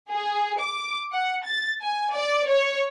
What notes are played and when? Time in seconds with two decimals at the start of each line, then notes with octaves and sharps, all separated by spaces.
0.10 G#4
0.60 D6
1.12 F#5
1.44 A6
1.81 G#5
2.13 D5
2.49 C#5